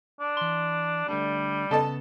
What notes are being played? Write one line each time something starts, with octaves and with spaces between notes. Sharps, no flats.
D4
E3 C6
D3 G3 A3 D4
C#3 B3 A4 D#5 A5